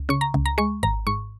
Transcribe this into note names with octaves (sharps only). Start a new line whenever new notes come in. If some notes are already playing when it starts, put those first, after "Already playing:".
Already playing: C#2
C#3 C#6
A#5
C#2
A#5
G#3 C#6
G#1 A#5
G#2 C#6